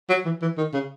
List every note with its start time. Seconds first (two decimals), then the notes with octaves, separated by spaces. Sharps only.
0.09 F#3
0.25 E3
0.42 E3
0.57 D#3
0.73 C#3